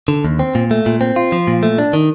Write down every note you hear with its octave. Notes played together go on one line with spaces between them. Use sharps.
D3
D#2
C4
A#2
A3
A#2
C4
F4
F3
A#2
A3
D4
D#3